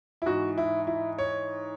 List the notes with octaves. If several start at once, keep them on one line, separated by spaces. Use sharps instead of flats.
E4
G#2 E3 F#4
E4
E4
C#5